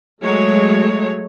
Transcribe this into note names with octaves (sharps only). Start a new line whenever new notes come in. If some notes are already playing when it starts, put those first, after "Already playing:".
F#3 G#3 A3 C#5